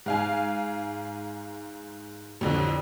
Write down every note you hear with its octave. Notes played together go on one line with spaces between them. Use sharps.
G#2 F5 G#5
A1 F2 D3